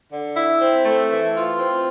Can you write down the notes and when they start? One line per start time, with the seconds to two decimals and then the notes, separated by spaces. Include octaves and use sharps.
0.12 D3
0.36 E4
0.61 C4
0.84 A3
1.09 E3
1.34 F4
1.57 C4